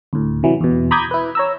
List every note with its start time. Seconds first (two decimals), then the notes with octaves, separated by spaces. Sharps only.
0.13 D2 A2
0.43 C3 E3 F#3
0.61 E2 B2
0.91 A#5 B5 D6 D#6 G6 G#6
1.11 E4 B4
1.35 C#5 A#5 E6